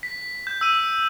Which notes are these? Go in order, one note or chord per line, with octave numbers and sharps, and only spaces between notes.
B6
G6
E6 D#7